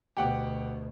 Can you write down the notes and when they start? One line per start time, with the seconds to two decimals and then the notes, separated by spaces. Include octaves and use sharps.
0.17 D2 B2 G4 F#5 D6